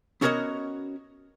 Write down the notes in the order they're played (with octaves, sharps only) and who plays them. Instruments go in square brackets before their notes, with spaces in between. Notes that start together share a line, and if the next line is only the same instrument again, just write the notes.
[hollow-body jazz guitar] B3 C#4 F#4 A#4 C#5 D#5